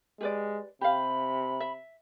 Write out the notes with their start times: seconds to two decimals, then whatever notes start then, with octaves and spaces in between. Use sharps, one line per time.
0.21 G#3 G4 B4 D5
0.81 C3 G4 F5 B5
1.60 E5